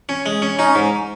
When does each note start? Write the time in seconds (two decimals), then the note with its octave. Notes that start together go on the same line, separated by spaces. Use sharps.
0.09 C#4
0.26 G#3
0.42 C#4
0.59 C#4 D#4
0.75 G#2